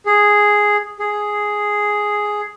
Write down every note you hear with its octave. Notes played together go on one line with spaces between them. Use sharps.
G#4
G#4